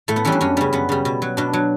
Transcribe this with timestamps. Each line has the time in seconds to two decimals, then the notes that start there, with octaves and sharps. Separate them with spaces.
0.08 A2 A3
0.16 B3
0.25 E3 G3 C#4
0.32 D4
0.41 F#2 C#4
0.57 C#3 G3 B3
0.73 F#2 B3
0.89 C#3 G3
1.05 B2
1.22 F#3
1.37 B2 D4
1.53 F#3